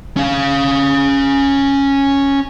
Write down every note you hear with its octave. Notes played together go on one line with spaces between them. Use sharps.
C#4 F5